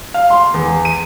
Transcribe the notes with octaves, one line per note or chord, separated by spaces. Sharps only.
F5
C6
E2
D#7